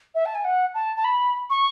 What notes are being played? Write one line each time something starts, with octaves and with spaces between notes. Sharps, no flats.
E5
A5
G#5
F#5
A5
A5
B5
C#6